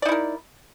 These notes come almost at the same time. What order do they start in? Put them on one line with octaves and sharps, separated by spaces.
D5 D#4 E4 A#4